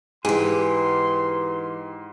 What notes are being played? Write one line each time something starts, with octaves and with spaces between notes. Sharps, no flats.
G#2 E3 G4 G#4 C6